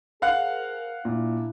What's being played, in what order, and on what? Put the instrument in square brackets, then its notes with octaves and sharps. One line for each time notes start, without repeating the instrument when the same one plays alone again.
[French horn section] G#4 A#4 C5 [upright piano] F5 F#5 F#6
[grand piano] A#2 [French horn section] D4 E4